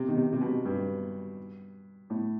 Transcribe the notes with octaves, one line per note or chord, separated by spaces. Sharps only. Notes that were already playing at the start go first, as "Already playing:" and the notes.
Already playing: C3
D#3
C3
C3
B2
G2
A2